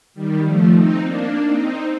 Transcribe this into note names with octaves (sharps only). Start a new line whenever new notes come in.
D#3 G3
F3 A3
C4 D#4
A#3 D4
C4 D#4